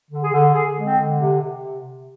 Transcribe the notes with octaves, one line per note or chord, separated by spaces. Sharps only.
D3
G#4
D3
D3 G#4
G#3
C4
D3
C3
C3